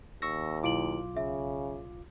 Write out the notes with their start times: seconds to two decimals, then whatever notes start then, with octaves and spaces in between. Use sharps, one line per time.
0.22 D#2 C#6 E6 A#6
0.64 B1 E4 F4 D6 D7 F#7
1.17 C#3 E5